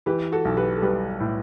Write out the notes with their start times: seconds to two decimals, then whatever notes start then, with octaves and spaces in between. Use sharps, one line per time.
0.06 E3 G4 B4
0.32 F#4 A4
0.45 B1
0.57 G4 B4
0.77 A4
0.82 G3 G4 B4
1.20 A2